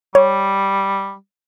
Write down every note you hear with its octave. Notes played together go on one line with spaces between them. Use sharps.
G3 C#5